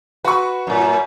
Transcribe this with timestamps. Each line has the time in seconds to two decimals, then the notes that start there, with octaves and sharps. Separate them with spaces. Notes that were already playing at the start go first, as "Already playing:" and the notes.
0.25 F#4 B4 C#6
0.67 F#2 A2